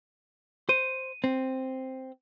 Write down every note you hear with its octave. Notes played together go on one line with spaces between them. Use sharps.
C5 D#7
C4